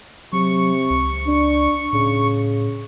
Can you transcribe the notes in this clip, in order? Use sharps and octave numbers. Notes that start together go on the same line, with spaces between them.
C3 F#3 C#6
C#2
D4
A2 C#3